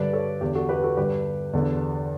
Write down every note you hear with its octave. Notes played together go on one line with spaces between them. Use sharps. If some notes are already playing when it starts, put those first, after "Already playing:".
Already playing: G2 D3 B4 D5
A4 C#5
E2 D3 G4
F#4 A4
G4 B4
F#4 A4
G2 D3 G4 B4
E2 D3